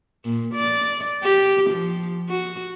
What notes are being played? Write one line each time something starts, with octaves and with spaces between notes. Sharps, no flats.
A#2
D5
G4
F3
F#4